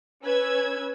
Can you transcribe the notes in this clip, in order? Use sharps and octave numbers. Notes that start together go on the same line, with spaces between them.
C#4 B4 E6 G#6